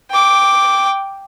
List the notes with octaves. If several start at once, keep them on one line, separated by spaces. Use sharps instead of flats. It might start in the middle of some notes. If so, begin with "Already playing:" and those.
G5 D6